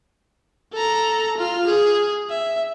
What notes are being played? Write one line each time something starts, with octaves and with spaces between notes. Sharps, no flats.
A4 A#5
F4 F6
G#4
E5